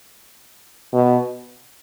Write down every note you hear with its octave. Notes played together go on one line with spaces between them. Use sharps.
B2